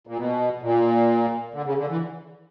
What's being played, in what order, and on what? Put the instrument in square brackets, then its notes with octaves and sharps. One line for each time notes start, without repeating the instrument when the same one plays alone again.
[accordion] A#2
B2
A#2
D3
C#3
D3
E3